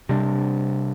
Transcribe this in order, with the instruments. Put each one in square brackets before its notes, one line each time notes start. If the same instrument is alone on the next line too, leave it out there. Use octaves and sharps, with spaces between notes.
[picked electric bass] C3 G3 D4